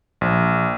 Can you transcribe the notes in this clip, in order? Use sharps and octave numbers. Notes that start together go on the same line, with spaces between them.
A#1